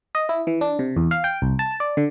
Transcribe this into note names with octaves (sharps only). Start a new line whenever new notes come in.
D#5
E4
E3
D4
C3
E2
F5
G5
C2
A5
D5
D3